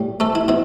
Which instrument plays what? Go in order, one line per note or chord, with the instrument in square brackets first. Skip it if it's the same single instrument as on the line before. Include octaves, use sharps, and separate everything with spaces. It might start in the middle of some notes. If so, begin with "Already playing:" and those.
Already playing: [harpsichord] A2 G3
A3 A4
E4
B2 E4